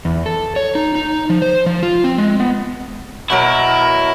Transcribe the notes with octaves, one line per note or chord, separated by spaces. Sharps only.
E2
A4
C#5
D#4
D#4
F3
C5
F3
F4
C4
G#3
B3
B2 F#3 E4 A#4